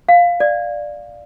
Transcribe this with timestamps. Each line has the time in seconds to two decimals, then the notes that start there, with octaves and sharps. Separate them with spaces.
0.09 F5
0.40 D5